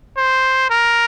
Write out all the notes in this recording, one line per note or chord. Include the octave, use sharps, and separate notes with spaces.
C5
A#4